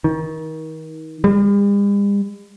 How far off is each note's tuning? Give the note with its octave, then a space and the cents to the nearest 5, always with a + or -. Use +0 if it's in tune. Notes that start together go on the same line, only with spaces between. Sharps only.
D#3 +30
G3 +45